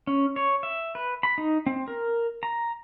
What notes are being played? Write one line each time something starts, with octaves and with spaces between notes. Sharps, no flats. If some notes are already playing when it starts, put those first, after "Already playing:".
C#4
C#5
E5
B4
B5
D#4
C4
A#4
A#5